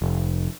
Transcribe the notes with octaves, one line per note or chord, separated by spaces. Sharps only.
F1